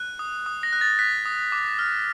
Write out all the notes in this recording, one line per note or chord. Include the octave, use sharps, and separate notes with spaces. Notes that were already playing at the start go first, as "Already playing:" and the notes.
Already playing: F#6
D#6
D#6
A#6
F#6
A6
F#6 B6
D#6
D6
F6